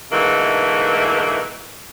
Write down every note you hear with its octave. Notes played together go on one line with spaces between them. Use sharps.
G#2 B2 D3 E3 A3 A#3